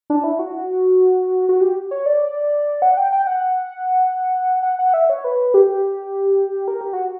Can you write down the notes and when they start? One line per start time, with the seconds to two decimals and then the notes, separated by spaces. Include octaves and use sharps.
0.10 D4
0.24 E4
0.39 F#4
1.49 F#4
1.61 G4
1.91 C#5
2.06 D5
2.82 F#5
2.97 G5
3.12 G5
3.27 F#5
4.63 F#5
4.79 F#5
4.94 E5
5.10 C#5
5.24 B4
5.54 G4
6.68 A#4
6.81 G4
6.93 F#4